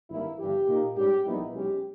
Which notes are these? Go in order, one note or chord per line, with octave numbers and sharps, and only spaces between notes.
G#1 G2 D#3 A#3 E4
G1 G2 E3 G4
A#2 A#3 D#4
G#2 G3 C#4 G4
A#1 A#2 G3 B3 D#4 E4
B1 B2 G#3 C#4 G4